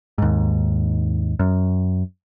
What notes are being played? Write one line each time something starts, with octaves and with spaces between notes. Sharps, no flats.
D#2 G#2
F#2